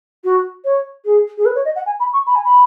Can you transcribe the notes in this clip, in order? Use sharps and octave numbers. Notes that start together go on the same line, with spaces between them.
F#4
C#5
G#4
G#4
B4
C#5
D#5
F#5
G#5
B5
C#6
B5
G#5
B5